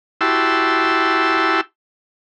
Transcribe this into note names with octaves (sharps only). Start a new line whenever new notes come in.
E4 F#4 G4 A5 C6 E6